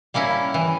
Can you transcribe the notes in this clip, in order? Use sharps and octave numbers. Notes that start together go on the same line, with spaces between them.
G3 A#3 C#4 E4
E3